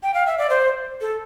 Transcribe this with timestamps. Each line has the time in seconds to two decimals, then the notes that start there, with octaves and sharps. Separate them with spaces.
0.03 G5
0.14 F5
0.27 E5
0.38 D5
0.50 C5
1.01 A4